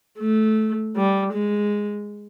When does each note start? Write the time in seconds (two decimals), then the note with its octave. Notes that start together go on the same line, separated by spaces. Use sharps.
0.19 A3
0.96 G3
1.33 G#3